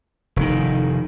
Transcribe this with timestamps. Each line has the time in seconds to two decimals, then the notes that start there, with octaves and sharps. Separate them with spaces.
0.36 F1 D#3